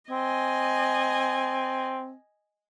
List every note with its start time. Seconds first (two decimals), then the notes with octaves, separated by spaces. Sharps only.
0.11 C4 D#5 G#5